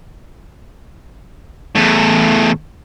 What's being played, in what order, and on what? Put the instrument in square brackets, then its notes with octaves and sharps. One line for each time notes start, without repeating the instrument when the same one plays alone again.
[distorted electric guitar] E2 A2